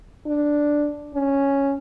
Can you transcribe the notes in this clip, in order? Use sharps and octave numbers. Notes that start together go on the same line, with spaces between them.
D4
C#4